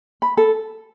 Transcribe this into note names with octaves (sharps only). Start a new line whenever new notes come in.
B5
A4